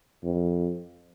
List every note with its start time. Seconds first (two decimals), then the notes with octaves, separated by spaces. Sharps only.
0.23 F2